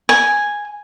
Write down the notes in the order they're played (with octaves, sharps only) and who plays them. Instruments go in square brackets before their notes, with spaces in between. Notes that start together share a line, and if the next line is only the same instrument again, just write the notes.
[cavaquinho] G#5